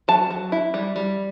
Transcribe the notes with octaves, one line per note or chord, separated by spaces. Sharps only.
F#3 A5
F#3
E4
G3
G3